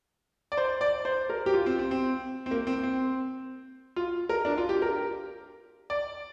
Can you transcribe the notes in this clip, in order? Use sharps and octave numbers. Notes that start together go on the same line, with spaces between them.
D5
C5
D5
C5
A#4
G4
F4
C4
C4
C4
C4
A#3
C4
C4
F4
A#4
D4
F4
G4
A#4
D5